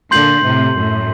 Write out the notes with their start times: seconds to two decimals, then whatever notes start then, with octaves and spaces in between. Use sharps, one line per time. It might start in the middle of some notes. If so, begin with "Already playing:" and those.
0.11 A#2 D3 C6 G6 C7 F#7
0.44 A2 C3
0.76 F#2 A2